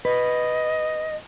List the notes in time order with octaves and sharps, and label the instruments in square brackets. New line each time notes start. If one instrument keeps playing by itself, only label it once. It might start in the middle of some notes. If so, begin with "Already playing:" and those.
[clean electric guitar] B4 [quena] D#5